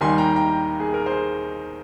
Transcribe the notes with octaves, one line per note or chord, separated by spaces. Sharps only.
D#2 D#3 G3 G#5 C6
G5 A#5
G5 A#5
G#4
A#4
G#4 C5